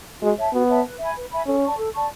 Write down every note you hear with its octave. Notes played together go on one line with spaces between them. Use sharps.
G#3 F#4
C#5 E5 A5
B3 F#4
C#5 E5 A5
B4
E5 G#5 B5
B4
E5 G#5 B5
C#4 A4
D5 A5 C#6
A4
D5 A5 C#6